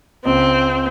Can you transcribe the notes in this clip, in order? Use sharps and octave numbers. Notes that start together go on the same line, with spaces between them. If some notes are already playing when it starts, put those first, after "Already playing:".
C#2 C4